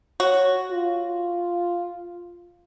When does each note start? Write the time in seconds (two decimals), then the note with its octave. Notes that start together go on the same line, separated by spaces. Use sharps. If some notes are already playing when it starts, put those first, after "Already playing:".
0.20 F#4 C#5
0.71 F4